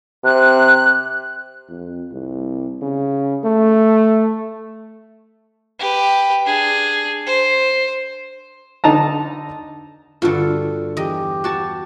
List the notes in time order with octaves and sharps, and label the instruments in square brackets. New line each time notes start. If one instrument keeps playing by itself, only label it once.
[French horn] C3 [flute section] F#6
[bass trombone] F2
C2
C#3
A3
[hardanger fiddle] G4 B4
D4 G#4
C5
[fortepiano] D3 D#4 A5 A#5
[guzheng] G2 D3 [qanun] F4 F#4 A4
[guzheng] E2 D#5 [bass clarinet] G4
[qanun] F#4 D5 A5